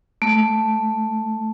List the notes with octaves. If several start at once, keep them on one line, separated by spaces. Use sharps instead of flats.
A3